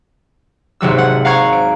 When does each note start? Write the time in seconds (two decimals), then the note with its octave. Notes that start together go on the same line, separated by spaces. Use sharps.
0.81 G#1 C3 F#3 E6
0.98 F#5
1.25 F5 F#5 A#5 C#6 G#6
1.52 D7